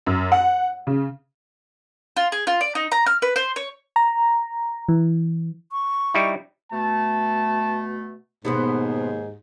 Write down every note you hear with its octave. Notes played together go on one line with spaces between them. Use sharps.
F#2
F#5
C#3
F4
G#4
F4
D5
D#4
A#5
F6
B4
C5
C#5
A#5
E3
C#6
G3 D#4 E4
B2 A3 A5
D#2 G#2 B2 B3 C5